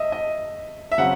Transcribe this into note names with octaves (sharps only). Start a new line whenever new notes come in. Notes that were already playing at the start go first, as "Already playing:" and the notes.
Already playing: D#5 E5
D#5
E5
C#3 F#3 C4 F#5